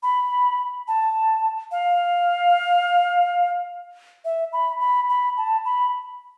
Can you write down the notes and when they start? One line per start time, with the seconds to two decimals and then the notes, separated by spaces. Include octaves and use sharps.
0.03 B5
0.88 A5
1.72 F5
4.25 E5
4.53 B5
4.81 B5
5.09 B5
5.37 A5
5.65 B5